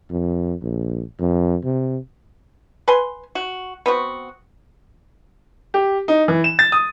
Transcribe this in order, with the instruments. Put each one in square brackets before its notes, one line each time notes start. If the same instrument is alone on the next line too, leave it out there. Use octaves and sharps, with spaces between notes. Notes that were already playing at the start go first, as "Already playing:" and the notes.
[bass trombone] F2
A#1
F2
C3
[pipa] B4 G#5 C6
F#4
B3 C4 F#4
[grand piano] G4
D#4
E3
E7
A6
D#6